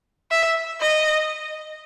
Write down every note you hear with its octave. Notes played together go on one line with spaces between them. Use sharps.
E5
D#5